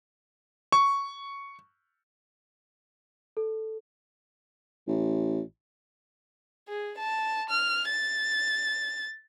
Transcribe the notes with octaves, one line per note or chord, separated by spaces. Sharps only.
C#6
A4
A1
G#4
A5
F6
A6